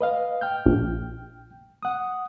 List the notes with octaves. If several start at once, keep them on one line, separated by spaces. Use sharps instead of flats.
B4 D#5 F5
G5 F6 G6
A#1
F#5 D#6